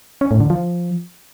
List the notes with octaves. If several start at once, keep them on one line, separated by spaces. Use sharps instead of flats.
C#4
A2
D3
F3